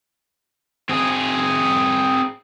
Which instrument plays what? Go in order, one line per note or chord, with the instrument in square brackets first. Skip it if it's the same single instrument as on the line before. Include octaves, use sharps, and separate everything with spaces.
[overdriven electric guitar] C4 G#4